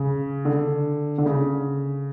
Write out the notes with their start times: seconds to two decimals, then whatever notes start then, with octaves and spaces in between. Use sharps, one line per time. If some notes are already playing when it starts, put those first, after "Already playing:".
Already playing: C#3
0.45 D3
1.18 D3
1.26 C#3